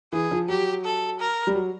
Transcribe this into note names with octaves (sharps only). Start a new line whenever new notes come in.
E3 G#4
F3
F#3 G4
A4
A#4
G3
F#3